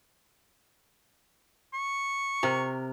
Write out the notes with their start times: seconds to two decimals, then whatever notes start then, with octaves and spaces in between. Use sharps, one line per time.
1.73 C#6
2.43 C3 A#4